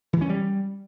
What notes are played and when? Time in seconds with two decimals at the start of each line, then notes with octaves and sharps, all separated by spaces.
0.13 E3
0.21 C#4
0.29 G3